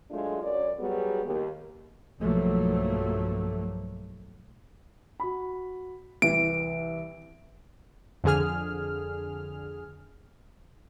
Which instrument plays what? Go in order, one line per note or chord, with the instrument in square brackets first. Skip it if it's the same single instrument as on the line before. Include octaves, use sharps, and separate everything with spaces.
[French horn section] F#3 G#3 A3 D4 F4
F#2 C#5 D5
F#3 G3 B3 F#4 G#4
D#2
[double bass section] B1 G2 F3 F#3 A3 A#3
[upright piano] F#4 B5
[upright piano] C2 E3 [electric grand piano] D7
[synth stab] F2 D3 G#4 F6